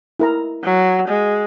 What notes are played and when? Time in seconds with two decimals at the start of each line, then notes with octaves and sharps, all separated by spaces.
0.19 E4 A#4 A#5
0.64 F#3
1.08 G#3